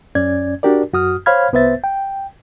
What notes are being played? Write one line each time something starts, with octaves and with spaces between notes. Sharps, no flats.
F#2 C#4 D5 G#6
D4 F#4 G4 A#4 D5
F#2 F#4 D#6 F6
C5 C#5 F5 B5 F6 G#6
C2 B3 B4 C5 E5 A6
G5